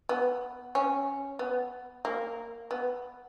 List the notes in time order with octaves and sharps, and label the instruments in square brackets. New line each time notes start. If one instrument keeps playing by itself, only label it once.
[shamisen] B3
C#4
B3
A#3
B3